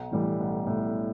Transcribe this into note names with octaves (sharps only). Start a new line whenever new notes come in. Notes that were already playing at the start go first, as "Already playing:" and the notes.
Already playing: B1
A2 E3 G3
B1
A2